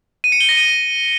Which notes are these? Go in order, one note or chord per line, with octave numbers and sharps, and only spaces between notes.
D#7
C#7
G7
A#6
D#7